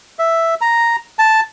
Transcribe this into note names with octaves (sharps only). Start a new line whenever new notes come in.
E5
A#5
A5